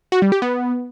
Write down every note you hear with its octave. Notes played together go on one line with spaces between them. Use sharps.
F#4
G3
G4
B3